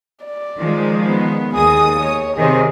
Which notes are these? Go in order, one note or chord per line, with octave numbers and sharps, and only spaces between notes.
D5
D#3 F3 G#3
B3
D#2 G#4 D#6
C#5
C3 D#3 G#4